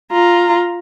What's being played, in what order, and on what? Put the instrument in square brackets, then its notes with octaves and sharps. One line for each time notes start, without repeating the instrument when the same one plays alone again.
[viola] F4 A#5